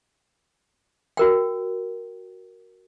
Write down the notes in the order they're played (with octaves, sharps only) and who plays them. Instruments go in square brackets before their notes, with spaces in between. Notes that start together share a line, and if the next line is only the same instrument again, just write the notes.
[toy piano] F#4 A#4 G5